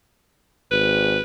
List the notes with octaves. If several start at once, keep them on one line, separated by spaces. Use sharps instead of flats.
G#1 B4